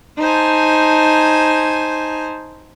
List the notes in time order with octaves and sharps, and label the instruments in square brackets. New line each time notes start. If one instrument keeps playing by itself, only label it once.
[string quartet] D#4 C5 G#5 A5